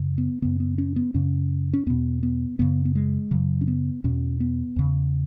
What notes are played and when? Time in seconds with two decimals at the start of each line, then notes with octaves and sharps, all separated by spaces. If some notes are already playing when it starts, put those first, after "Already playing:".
Already playing: F#2 C#3
0.18 B3
0.42 F#2 C#3 B3
0.60 B3
0.78 C#4
0.96 B3
1.14 F#2 C#3 C#4
1.73 C#4
1.86 E2 B2 B3
2.23 B3
2.59 F#2 C#3 B3
2.85 B3
2.95 G#3
3.31 F#2 C#3 F#3
3.61 C#4
3.68 B3
4.04 E2 B2 C#4
4.40 B3
4.76 E2 C#3